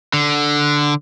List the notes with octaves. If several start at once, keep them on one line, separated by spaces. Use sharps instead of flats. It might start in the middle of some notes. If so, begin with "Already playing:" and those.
D3